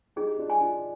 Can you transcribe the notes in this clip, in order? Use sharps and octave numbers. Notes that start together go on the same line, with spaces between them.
D#4 G4 G#4
D4 F4
G#5
D4 F4